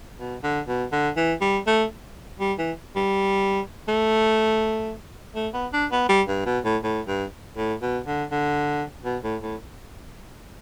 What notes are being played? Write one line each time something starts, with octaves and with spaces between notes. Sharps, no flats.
B2
D3
B2
D3
E3
G3
A3
G3
E3
G3
A3
A3
B3
D4
B3
G3
G2
B2
A2
A2
G2
A2
B2
D3
D3
B2
A2
A2